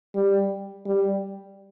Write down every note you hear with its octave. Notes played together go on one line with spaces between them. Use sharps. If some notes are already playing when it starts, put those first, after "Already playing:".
G3
G3